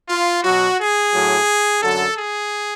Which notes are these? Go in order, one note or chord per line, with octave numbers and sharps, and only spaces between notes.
F4
B2 F#3 F#4
G#4
A2 F#3
F#2 D3 F#3 A4
G#4